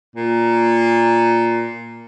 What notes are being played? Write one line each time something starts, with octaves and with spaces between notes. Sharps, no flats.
A#2